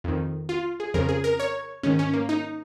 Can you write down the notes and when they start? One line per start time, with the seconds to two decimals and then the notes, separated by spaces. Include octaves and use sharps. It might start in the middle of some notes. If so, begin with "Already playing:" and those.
0.04 F2 D#3
0.49 F4
0.80 G#4
0.94 F2 C#3 F3 A#4
1.09 G#4
1.24 A#4
1.40 C#5
1.83 G#2 D#3 C#4
1.99 C#4
2.13 A#3
2.29 D#4